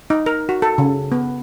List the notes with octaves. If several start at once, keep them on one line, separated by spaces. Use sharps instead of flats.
D#4
A#4
F#4
A4
C#3
B3